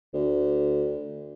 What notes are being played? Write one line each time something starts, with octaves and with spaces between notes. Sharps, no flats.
D2